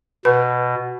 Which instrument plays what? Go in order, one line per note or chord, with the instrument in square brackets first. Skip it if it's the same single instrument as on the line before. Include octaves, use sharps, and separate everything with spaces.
[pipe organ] B2 [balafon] B4